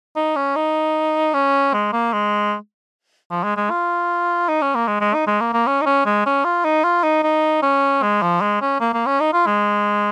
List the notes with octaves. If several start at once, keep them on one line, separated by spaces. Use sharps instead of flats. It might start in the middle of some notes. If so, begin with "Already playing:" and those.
D#4
C#4
D#4
C#4
G#3
A#3
G#3
F3
G#3
G#3
F4
D#4
C#4
A#3
G#3
G#3
D#4
G#3
A#3
A#3
C#4
D#4
C#4
G#3
C#4
F4
D#4
F4
D#4
D#4
C#4
G#3
F3
G#3
C#4
A#3
A#3
C#4
D#4
F4
G#3